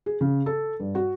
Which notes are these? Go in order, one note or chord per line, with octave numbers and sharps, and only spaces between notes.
G#4
C#3
A4
G2
F#4